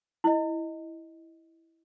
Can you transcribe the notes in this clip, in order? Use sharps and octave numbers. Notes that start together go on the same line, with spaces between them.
E4 D#5